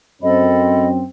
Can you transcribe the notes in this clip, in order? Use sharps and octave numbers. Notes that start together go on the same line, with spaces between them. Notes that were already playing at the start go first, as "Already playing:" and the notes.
F#2 C4 A4 D#5 B5